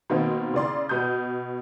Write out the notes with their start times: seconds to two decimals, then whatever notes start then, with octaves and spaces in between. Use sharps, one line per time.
0.10 B2 D#3 A#3 C4
0.54 C#3 E4 D5 C6
0.89 B2 D#6 G6